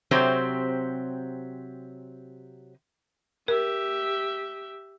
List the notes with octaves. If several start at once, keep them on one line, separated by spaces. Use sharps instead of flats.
C3 F#3 C4 G4 C5 C#5
G4 A#4 E5